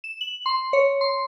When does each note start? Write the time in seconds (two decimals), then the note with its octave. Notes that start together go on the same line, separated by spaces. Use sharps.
0.04 E7
0.21 F#7
0.46 C6
0.73 C#5
1.01 C6